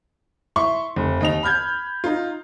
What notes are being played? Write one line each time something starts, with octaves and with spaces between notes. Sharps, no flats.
E4 C6 C#6
F1
D#2 D#5 F7
B5 F6 G6 G#6
D#4 F4